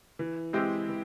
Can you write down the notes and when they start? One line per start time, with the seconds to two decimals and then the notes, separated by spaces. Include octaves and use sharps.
0.19 E3
0.53 G#3 C4 E4 G4
0.89 E3